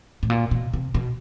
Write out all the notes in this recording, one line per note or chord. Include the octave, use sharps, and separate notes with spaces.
A2
A#2
B2
C3
B2